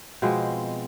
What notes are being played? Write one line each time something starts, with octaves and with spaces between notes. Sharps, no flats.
B2 F3 G#3 C4